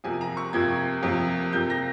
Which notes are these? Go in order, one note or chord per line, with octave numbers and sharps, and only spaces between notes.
F2 C3 F3 A#3 G#5
A#5
C#6
F2 C3 F3 A#3 G#6
F2 C3 F3 A#3
F2 C3 F3 A#3 G6
A#6